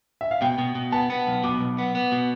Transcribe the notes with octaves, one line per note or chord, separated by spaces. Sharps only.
E5
F5
B2 G5
B2
B2
B3 A5
B3
B1
B2 D6
B1
B3
B3
B2